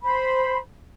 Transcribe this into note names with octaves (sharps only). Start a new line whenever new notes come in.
C5 B5